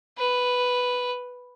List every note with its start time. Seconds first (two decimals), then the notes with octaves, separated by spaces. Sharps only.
0.18 B4